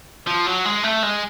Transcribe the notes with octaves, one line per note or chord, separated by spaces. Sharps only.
F3
F#3
G#3
A3
G#3